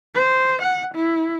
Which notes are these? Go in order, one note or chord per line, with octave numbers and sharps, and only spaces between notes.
C5
F#5
E4